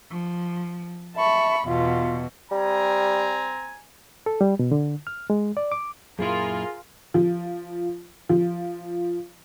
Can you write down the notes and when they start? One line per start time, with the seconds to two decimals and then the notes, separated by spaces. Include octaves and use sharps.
0.12 F3
1.17 E5 A5 B5 C#6
1.66 E2 B2 F4
2.51 G3 C4 G#5 A#5
4.26 A4
4.41 G3
4.59 B2
4.72 D3
5.07 F6
5.30 G#3
5.57 D5
5.72 D6
6.19 F#2 A#2 E4 F4 G#4 A#4
7.14 F3
8.29 F3